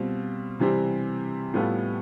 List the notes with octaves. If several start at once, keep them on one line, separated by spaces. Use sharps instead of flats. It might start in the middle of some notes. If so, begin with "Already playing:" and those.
Already playing: B2 G3 C4 F4
C3 E3 G3 C4 G4
A2 G3 B3 F4 A4